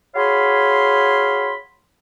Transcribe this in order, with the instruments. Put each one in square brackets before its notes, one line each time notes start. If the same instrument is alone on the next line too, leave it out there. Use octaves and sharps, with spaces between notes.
[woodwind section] F#4 G#4 C#5 F5 B5 C6